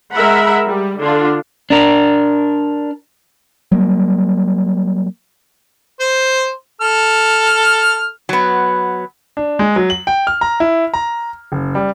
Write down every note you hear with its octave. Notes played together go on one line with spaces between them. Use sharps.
G#3 A#4 E5 F#5 B5
G3
D3 D4 F4
D4 A#4
F#3 G3 A#3
C5
A4 F6
F#3 B3
D4
G#3
F#3
F#7
G5
F6
A#5
E4
A#5
F#1
G3